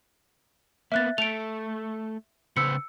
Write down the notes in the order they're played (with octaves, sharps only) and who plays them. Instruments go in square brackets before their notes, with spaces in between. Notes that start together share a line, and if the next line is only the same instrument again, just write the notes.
[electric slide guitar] A#3 B3 [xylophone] E5 F#6 A6
[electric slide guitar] A3 A4 [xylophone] D7 F7
[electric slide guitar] C#3 B4 C5 [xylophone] E6 C#7